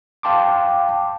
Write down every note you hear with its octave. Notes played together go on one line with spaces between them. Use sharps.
F5 G5 A5 C6 D6